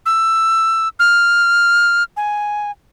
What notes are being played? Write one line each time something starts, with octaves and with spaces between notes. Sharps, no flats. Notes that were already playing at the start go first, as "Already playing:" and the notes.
E6
F6
G#5